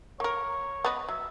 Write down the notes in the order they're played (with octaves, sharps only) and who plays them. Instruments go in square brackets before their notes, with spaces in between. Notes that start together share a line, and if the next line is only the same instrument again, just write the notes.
[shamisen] A#3 A#4 [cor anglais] C#5
[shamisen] B3 B4 D#5
[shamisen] F#3 [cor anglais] E5